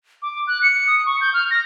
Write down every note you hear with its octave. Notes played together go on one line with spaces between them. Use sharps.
D6
F#6
C#7
D#6
C#6
G6
F6
A#6